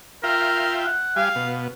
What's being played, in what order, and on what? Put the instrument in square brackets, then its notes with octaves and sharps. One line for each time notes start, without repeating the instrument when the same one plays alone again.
[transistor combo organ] F4 E5 G5 [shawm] A#4
[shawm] F#5
[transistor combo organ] G3 G#5 [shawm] F5
[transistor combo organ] B2